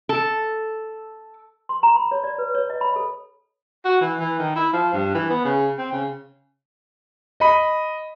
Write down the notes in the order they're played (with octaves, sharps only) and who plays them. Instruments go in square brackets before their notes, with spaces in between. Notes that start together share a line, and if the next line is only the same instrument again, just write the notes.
[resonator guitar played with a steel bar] A4
[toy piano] C6
A#5
B5
C#5
D5
B4
C#5
D#5
B5
A4
[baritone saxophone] F#4
E3
E3
D#3
E4
F3
G2
E3
B3
C#3
C4
C#3
[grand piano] D#5 B5